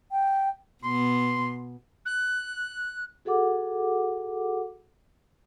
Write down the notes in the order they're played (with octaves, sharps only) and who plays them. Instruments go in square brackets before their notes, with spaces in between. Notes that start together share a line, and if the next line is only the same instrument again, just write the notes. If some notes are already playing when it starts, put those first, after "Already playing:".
[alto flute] G5
[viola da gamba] B2 B3 [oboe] C6
[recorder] F#6
[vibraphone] F#4 G#4 A4 F#5 D6